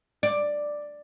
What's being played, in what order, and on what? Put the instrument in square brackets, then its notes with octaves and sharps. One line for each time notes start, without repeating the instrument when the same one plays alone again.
[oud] D5